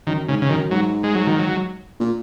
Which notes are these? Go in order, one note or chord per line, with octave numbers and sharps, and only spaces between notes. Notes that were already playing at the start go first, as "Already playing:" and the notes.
F#2 D#3
G#2 C#3
C#3
F#2 D#3
G#2 F#3
G#3
F#3
D#3
F#3
A#2